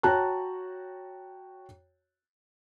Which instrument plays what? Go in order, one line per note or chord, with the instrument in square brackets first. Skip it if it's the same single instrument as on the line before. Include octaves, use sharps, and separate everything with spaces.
[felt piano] F#4 C#5 G5 A5 A#5 F#6